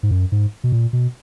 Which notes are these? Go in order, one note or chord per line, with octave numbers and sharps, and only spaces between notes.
G#2
F#2
G#2
B2
A#2
B2